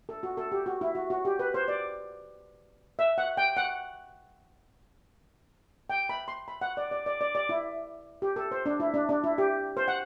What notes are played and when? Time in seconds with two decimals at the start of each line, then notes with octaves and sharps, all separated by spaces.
0.09 A4
0.23 F#4
0.37 A4
0.52 G4
0.66 F#4
0.81 E4
0.95 F#4
1.10 F#4
1.25 G4
1.39 B4
1.54 C5
1.68 D5
2.99 E5
3.18 F#5
3.37 G5
3.57 F#5
5.90 G5
6.09 B5
6.28 C6
6.48 B5
6.61 F#5
6.77 D5
6.91 D5
7.06 D5
7.21 D5
7.35 D5
7.49 E4
8.22 G4
8.36 A4
8.51 C5
8.66 D4
8.80 E4
8.94 D4
9.09 D4
9.24 E4
9.38 G4
9.77 C5
9.88 F#5